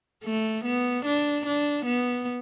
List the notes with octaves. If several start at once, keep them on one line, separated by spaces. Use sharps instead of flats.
A3
B3
D4
D4
B3